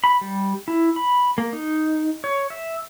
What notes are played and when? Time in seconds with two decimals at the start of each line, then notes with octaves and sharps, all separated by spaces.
0.04 B5
0.21 G3
0.68 E4
0.96 B5
1.38 A#3
1.53 D#4
2.24 C#5
2.50 E5